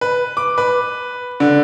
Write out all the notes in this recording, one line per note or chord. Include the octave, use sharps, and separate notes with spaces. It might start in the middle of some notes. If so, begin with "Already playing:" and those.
B4
D6
B4
D3